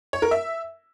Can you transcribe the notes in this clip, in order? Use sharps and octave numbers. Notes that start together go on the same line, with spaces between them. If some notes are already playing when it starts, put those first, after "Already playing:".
C#5
A#4
E5